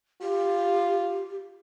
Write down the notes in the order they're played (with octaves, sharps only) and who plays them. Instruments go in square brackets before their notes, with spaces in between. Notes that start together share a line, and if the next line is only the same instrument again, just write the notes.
[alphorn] F4 [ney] G4